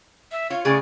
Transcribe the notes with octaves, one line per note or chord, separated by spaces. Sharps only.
E5
F4 C#5
A2 C#3 G#4 D5